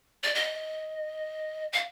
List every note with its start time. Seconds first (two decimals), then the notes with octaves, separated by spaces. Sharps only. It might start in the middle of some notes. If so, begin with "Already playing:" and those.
0.23 D5
0.35 D#5
1.73 F5